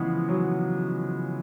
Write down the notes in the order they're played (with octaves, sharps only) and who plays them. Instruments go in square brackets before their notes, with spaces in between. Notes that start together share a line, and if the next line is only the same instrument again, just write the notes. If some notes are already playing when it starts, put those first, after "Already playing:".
Already playing: [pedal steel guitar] C#3 F3 G#3 B3 [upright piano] E3
[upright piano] F#3